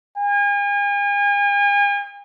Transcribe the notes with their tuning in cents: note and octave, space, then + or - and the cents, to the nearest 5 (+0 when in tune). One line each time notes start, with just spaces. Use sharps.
G#5 -40